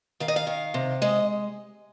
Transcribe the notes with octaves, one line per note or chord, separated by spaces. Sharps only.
D#3 F5
D#5
F5
D#3
C3
G#3 D#5